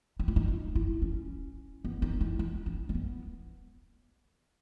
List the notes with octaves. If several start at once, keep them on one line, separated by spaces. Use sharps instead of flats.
D#4
E4
D#4
D#4
E4
C#4
B3
D#4
E4
E4
C#4
A#3
B3